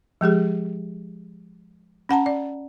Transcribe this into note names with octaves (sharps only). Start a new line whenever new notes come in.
F3 G#3 G4 G#4
C#4 F#5 A5 A#5
D5